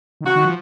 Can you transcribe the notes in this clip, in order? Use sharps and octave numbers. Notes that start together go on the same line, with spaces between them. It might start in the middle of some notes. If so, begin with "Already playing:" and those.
D#3
C#3 F#4
D#3
F3